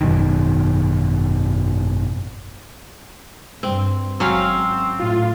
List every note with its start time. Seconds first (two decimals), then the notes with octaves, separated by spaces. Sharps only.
0.01 G#1 F#2 B2 D#3
3.63 G2 C4
4.20 G#1 F#3 C4 C#4 F5
4.99 A2 F4